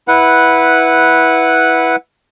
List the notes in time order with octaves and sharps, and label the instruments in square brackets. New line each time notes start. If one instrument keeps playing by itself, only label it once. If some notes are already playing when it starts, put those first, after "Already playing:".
[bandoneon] E4 B4 F#5